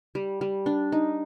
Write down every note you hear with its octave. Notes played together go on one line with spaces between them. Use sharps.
G3
G3
D4
D#4